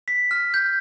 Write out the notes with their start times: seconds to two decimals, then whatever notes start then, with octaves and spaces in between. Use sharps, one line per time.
0.08 B6
0.31 F6
0.54 G6